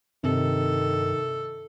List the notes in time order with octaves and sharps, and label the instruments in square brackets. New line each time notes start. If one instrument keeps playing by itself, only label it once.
[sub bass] G2 [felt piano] C3 [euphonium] D#3 [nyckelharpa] A4